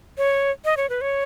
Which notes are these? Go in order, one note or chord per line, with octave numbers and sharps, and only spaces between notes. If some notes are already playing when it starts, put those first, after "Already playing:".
C#5
D#5
C#5
B4
C#5